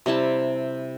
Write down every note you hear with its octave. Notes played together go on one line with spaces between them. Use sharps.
C3 G3 E4 A5